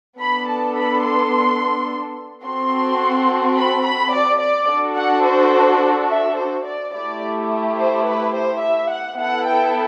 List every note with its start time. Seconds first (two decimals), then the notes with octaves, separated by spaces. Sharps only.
0.20 B3 D4 A4 B5
0.49 A5
0.77 B5
1.04 C6
2.45 C4 F#4 A4 C6
3.57 B5
3.86 B5
4.13 D5
4.41 D5
4.69 D4 F#4 A4
4.97 F#5
5.25 C5
6.10 E5
6.38 C5
6.66 D5
6.93 A3 E4 G4 D5
7.78 C5
8.06 B4
8.34 C5
8.63 E5
8.90 F#5
9.18 B3 E4 A4 F#5
9.46 G5